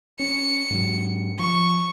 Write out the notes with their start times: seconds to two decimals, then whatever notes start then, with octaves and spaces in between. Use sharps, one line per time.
0.19 C#4 C#7
0.70 G#2 F#3
1.39 F3 C#6